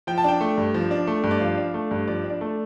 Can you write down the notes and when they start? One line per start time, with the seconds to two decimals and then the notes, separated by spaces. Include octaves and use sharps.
0.07 F3 G5
0.18 A5
0.24 D4 G5
0.41 A3
0.58 G2
0.74 F3
0.91 D4
1.07 A3
1.24 G2
1.31 D5
1.41 F3 F5
1.57 D4
1.74 A3
1.91 G2
2.07 F3 D5
2.24 D4
2.30 D5
2.41 A3